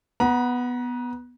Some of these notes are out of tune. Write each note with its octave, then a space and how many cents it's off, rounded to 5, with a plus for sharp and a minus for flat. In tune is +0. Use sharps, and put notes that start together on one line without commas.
B3 +0 A#5 +40